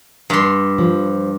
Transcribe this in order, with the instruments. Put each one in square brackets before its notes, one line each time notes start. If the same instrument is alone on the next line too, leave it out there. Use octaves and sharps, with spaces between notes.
[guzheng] G2 C6
[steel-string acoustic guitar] F3